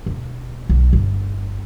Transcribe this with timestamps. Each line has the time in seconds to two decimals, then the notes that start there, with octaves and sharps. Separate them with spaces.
0.06 E1
0.69 B1
0.93 G1